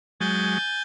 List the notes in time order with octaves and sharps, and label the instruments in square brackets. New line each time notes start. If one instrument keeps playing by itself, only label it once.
[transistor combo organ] F#3 G#3 [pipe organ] G#5 G6 A6